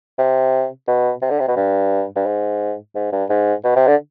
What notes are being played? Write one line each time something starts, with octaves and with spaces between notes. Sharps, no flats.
C3
B2
C3
D3
C3
B2
G2
G2
G#2
G#2
G2
G#2
B2
C3
D3